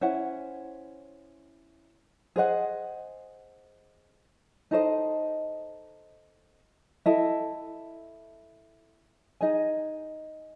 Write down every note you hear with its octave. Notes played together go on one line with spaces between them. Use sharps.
C#4 E4 C5 F#5
G#4 C5 D#5 F#5
D#4 A4 C5 D#5
E4 A4 D#5
D#4 G#4 D#5 G#5